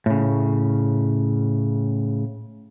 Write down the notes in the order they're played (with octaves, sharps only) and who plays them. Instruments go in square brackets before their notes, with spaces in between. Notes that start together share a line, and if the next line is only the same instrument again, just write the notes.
[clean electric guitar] A2 C#3